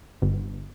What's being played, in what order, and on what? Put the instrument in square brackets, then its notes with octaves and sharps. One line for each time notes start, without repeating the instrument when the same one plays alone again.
[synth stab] G1